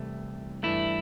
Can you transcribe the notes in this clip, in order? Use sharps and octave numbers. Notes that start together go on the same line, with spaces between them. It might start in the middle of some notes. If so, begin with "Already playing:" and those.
Already playing: C2 C3 E3 A3
G2 E3 A3 E4